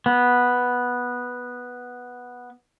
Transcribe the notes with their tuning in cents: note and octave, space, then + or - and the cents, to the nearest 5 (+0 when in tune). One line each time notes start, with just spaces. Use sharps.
B3 -5